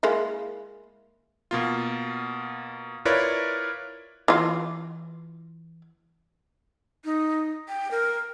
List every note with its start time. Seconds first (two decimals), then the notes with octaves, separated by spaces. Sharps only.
0.03 G#3 A#3 E4
1.51 B2 A#3 F4
3.05 E4 F4 A#4 B4 C#5 D5
4.28 E3 F4
7.05 D#4
7.68 G5
7.91 A#4